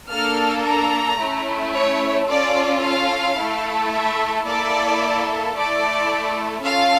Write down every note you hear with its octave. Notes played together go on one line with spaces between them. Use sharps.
A#3 D4 A4 F6
A#5
A3 C#4 E4
C#5
C#4 F4 A4 D5
F5
A3 E4 A4
E5
A#3 E4 A4 D5
A3 E4 A4 D5
C#4 F4 A4 F5